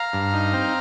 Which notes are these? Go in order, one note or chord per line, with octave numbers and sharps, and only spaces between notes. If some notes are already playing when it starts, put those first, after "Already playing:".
Already playing: F5 A#5
G2
D#4
C4